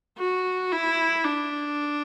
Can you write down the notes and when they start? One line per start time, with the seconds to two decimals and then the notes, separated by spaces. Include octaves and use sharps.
0.18 F#4
0.72 E4
1.25 D4